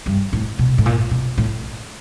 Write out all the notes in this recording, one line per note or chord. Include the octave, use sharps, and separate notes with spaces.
G2
A2
B2
A2
A#2
B2
A2